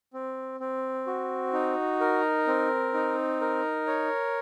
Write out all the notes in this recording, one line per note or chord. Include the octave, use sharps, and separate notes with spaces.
C4
C4
F#4
D#4
A#4
C4
D#4
A#4
C#5